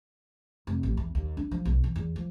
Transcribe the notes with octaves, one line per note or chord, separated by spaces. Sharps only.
F1
A1
E2
D#2
D4
F3
B1
E3
E2
F3